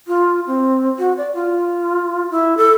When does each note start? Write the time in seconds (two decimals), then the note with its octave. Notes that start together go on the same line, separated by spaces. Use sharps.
0.07 F4
0.47 C4
0.99 F#4
1.18 D5
1.34 F4
2.31 E4
2.57 A4